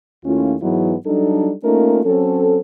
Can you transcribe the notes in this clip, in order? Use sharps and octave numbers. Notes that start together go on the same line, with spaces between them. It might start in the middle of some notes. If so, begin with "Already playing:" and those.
D#2 A3 C#4 E4 F4
G#2 E3 F#3 G#3 B3 E4
F#3 G3 D4 D#4 A4
A3 A#3 C#4 D#4 F4 A#4
F#3 C4 C#4 A4